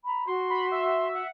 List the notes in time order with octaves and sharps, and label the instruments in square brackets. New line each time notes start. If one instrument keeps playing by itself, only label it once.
[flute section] A#5 B5
[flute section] F#4 [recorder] C6
[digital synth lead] B5
E5
[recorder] F#5